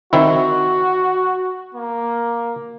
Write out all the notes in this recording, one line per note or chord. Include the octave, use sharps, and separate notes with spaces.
D#3 C4 E4 F#4
A#3